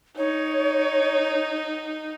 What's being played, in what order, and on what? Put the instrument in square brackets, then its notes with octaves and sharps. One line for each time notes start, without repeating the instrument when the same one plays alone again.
[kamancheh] D#4 [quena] C#5